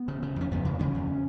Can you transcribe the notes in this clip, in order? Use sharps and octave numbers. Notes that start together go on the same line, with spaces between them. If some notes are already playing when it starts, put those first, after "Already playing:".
Already playing: B3
C#3
C#3
F2 C#4
F2 B3
C#3
C#3 C#4
F2